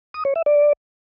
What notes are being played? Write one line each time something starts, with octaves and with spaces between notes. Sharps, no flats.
D#6
C#5
E5
D5